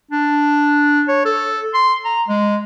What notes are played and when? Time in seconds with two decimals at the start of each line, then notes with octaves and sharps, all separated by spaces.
0.11 D4
1.08 C#5
1.25 A4
1.74 C6
2.05 A#5
2.28 G#3